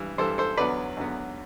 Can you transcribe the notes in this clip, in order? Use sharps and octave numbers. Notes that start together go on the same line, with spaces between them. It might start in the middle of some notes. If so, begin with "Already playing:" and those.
Already playing: G2 E3 G3
G2 E3 G3 A4 C5
A4 C5
E2 D3 F#3 B3 B4 D5
E2 D3 F#3 B3